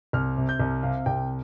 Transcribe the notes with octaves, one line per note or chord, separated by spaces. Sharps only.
C2 F6
C3
G6
C2
C3 F5
C2 G5